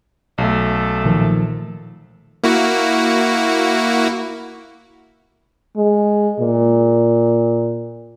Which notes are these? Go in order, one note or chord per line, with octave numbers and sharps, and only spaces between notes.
B1 A3
A#2 D#3 F3
A#3 E4 F#4
G#3
A#2